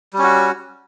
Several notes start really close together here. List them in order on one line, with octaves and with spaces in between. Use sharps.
G3 C#4 F#4